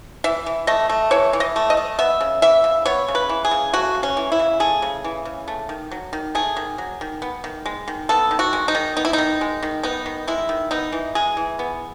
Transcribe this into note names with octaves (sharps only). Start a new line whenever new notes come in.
E3 E5
E3
A3 D#5
A3
E3 C#5
E3
D#5
A3
D#5
A3
B3 E5
C#3
E3 E5
C#3
B3 C#5
C#3
B4
E3
G#4
C#3
A3 F#4
C#3
C#4
E3
E4
C#3
A3 G#4
C#3
E3
C#3
A3
D#3
F#3
D#3
A3 G#4
D#3
F#3
D#3
B3
D#3
G#3
D#3
B3 A4
D#3
F#4
G#3
D#4
D#3
B3 D#4
E4
D#4
D#3
G#3
D#3
B3 D#4
D#3
G#3 E4
D#3
B3 D#4
E3
G#3 G#4
E3
B3